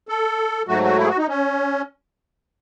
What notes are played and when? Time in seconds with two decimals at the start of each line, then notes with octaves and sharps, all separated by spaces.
0.09 A4
0.68 G#2 F#3 A3 F#4
0.84 F#4
0.98 E4
1.04 G#4
1.08 F#4
1.18 D#4
1.28 C#4